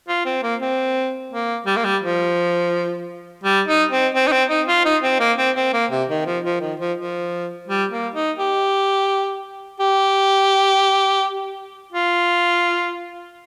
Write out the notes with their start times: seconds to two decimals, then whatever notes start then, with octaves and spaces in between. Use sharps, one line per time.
0.08 F4
0.26 C4
0.43 A#3
0.62 C4
1.32 A#3
1.66 G3
1.76 A#3
1.84 G3
2.02 F3
3.44 G3
3.68 D#4
3.91 C4
4.15 C4
4.28 D#4
4.32 C4
4.49 D#4
4.68 F4
4.85 D#4
5.03 C4
5.20 A#3
5.38 C4
5.56 C4
5.73 A#3
5.91 C3
6.09 D#3
6.26 F3
6.45 F3
6.61 D#3
6.80 F3
6.98 F3
7.68 G3
7.91 A#3
8.15 D#4
8.39 G4
9.80 G4
11.93 F4